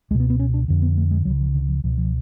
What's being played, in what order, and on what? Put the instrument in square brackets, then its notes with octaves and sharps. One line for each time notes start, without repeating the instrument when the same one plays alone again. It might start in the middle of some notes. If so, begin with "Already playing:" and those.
[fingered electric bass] C#2 G#3
B2
B3
B3
C#4
D4
F2 D3
B3
A3
G#3
C#2 C#3 F#3
F3
D3
F3
C#2 B2 F3
F3